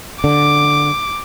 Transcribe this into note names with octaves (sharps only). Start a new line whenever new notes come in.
D3 D6